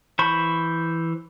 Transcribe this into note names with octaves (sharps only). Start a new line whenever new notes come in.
E3 C5 B5 C#6